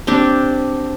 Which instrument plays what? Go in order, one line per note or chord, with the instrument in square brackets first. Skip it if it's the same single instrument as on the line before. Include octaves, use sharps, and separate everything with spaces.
[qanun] C4 D4 G4